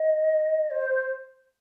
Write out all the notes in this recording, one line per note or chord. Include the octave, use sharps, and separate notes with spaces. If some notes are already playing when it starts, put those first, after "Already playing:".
Already playing: D#5
C5